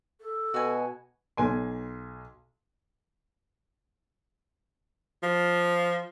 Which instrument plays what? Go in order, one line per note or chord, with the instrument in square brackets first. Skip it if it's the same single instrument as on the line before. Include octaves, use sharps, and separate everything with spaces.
[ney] A4
[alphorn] B2 [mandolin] F#4 G#5
[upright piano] B1 G#5 C6
[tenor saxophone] F3